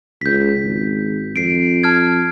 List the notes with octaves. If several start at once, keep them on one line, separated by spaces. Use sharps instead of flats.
C#2 G6 B6
G#1
F2 C7 D7
A5 F6 G#6